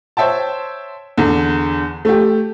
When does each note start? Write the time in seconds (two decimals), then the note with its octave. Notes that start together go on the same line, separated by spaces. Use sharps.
0.17 C5 C#5 E5 G5 A5
1.18 E2 D3
2.05 A3 G4